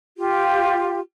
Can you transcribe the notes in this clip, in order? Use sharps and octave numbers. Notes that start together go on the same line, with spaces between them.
F4 G4